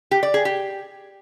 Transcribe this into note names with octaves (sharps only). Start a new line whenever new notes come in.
G4
D5
G#4
G4